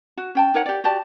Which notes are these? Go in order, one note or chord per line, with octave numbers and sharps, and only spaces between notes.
F#4
C#4 G5 A5
D#4 A#4 C#5 F#5
G4 D5
F#4 G4 D5 A5